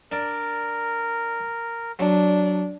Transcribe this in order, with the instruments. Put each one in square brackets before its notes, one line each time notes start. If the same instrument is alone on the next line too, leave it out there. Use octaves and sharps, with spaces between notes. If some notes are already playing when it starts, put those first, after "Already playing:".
[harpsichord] D4 D5 [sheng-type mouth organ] A#4
[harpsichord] F#3 [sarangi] D4